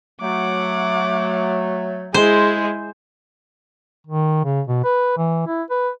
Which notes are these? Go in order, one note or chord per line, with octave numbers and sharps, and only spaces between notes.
F#3 A3 F#5 D6
G#3 E4 G#4 C5
D#3
C#3
B2
B4
E3
E4
B4